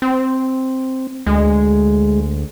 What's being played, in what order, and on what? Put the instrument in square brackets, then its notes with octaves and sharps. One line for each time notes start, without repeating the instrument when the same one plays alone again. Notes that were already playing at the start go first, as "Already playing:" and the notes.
[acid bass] C4
[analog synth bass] D2 [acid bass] G#3